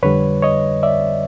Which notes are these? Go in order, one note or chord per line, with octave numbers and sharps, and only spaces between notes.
F2 D3 G3 B4 C#5
C#5 D#5
D5 E5